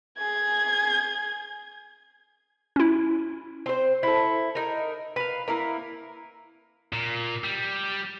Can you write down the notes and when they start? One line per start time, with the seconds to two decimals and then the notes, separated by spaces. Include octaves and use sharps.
0.18 G#4 G#6
2.76 C#4 E4
3.66 C4 C5
4.03 E4 A4
4.55 D#4 A#4
5.16 B4 F5
5.48 A#3 E4 A#4
6.93 A#2
7.44 G3